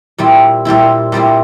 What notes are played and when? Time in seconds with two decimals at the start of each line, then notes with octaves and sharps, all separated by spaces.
0.18 A#2 G3 C4 E4
0.65 A#2 G3 C4 E4
1.12 A#2 G3 C4 E4